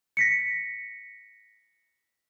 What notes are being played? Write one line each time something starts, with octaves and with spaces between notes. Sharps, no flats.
A#6 B6 C#7